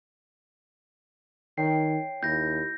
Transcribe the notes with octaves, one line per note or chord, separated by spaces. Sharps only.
D#3 C#5 G5 C7
D#2 E4 G6 A#6